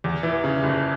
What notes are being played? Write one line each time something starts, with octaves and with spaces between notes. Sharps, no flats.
E2
E3
C#3
F#1